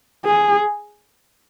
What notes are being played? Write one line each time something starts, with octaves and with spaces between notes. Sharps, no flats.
G#4